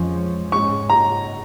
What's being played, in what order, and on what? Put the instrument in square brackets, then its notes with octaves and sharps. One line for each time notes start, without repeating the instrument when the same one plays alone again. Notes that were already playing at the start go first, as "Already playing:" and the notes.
Already playing: [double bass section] F2 F3 G#3 C#4
[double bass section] G#2 G#3 C#4 [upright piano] C#6
[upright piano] A#5